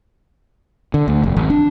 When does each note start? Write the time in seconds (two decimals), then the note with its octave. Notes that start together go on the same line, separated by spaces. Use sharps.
0.94 D3
1.08 D2
1.23 F1
1.37 G#1
1.50 D4